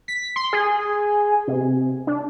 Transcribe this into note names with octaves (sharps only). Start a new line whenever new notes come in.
B6
C6
G#4
C3
D4